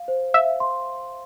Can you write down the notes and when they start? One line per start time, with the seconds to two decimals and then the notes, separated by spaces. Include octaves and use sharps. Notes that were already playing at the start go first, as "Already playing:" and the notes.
Already playing: F5
0.08 C5
0.34 E5 F5
0.60 C6